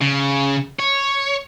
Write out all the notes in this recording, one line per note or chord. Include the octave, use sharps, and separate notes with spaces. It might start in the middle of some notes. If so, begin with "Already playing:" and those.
C#3
C#5